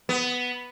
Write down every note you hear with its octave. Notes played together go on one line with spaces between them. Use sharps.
B3